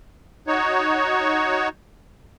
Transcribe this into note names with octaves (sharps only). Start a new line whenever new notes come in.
D#4 F#4 C#5